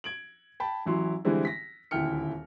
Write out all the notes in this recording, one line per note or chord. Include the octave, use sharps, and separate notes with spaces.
G#6 D7 F#7
G5 A5 B5
A1 E3 F#3 E4 C6
D3 E3 G3 G#3 C4 E4
A#6 B6
D#1 D2 E4 G5 F6 C#7